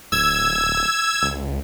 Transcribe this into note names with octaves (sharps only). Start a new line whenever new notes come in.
D1 E6 G#6
C#2